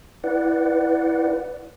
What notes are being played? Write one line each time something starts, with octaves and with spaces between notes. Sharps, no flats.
E4 B4 D5 F#5